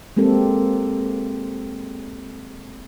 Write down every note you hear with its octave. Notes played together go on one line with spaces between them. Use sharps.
G#3 A#3 C4 G4 A4